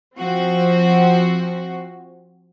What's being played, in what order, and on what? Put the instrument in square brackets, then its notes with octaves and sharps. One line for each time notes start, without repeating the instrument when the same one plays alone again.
[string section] F3 C4 F#4